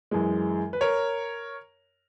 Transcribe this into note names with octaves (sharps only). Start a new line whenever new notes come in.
F#2 E3 G#3
B4
A#4 C#5